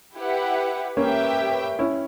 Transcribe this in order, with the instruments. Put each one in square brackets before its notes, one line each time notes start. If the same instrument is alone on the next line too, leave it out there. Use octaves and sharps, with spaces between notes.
[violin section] E4 G4 B4 F#5
[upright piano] A#3 C#4 [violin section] G4 B4 E5 G5
[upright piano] C#4 E4